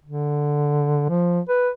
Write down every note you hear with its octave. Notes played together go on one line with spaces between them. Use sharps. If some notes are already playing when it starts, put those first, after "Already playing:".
D3
F3
B4